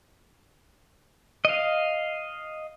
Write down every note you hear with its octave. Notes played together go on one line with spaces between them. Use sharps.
D#5 F5